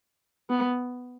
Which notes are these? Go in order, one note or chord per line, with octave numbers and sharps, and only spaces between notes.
B3